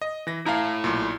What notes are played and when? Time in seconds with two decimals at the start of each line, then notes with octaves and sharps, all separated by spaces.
0.02 D#5
0.27 E3 A#6
0.46 E4 F5 A5 A#5
0.84 B1 A#2